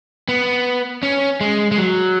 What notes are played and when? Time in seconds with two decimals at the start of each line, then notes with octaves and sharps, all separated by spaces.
0.29 B3
1.03 C#4
1.41 G#3
1.72 G#3
1.78 F#3